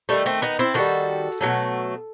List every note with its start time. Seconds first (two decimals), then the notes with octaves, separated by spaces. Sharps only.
0.09 D#3 G3 A3
0.26 A3 C4
0.42 B3 D#4
0.59 C4 E4
0.74 D#3 G3 F#4 A4
1.41 B2 F#3 A3